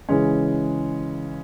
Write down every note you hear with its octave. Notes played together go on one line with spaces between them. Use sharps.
C#3 E3 G#3 C#4